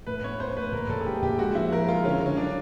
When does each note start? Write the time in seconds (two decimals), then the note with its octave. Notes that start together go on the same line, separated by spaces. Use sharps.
0.07 A2 B4
0.24 B3 C#5
0.40 B3 C5
0.57 A2 B4
0.73 A#2 A#4
0.89 A#2 A4
1.00 G#4
1.06 A3 G4
1.22 A#2 G4
1.38 G#3 F#4
1.55 F3 E4
1.72 F3 A#4
1.88 G#3 F4
2.04 D3 C#4
2.21 D3 C#4
2.37 F#3 D4